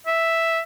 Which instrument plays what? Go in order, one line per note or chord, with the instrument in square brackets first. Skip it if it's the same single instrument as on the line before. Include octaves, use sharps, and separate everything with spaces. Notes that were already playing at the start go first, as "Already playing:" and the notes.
[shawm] E5